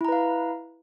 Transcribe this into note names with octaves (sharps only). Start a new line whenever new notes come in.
E4 B4 F5 A#5